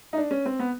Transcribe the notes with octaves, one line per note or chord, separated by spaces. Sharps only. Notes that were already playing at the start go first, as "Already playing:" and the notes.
D#4
D4
C#4
C4
B3